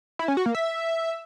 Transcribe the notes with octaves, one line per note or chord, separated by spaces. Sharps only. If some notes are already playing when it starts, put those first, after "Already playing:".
E4
C#4
F#4
A#3
E5